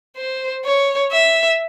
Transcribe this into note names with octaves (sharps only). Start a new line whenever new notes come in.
C5
C#5
E5